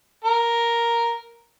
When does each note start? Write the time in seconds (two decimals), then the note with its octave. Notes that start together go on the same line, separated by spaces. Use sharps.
0.24 A#4